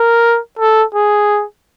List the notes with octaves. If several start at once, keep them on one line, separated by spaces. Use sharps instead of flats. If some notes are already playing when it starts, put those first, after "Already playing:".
Already playing: A#4
A4
G#4